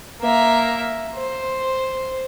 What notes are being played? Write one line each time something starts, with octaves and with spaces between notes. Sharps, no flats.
A#3 E5
C5